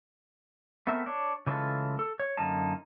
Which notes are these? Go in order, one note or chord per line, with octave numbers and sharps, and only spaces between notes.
A3 B3 C4 A#4 E5
D4 C#5
C#3 E3 G#3 A3 F4 A4
A4
C#5
F#2 D3 A#3 D#4 A5